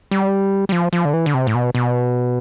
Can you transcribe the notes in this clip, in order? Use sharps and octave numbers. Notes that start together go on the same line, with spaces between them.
G3
G3
F3
F3
D3
E3
D3
C3
A2
B2
B2